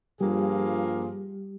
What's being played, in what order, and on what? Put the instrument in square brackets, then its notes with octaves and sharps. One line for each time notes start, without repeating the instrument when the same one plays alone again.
[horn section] G2 F3 A#3 F4 G#4 [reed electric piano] G3 G4